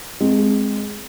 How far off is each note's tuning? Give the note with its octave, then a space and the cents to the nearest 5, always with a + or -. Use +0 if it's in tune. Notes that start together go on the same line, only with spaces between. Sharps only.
G#3 +0 C4 +0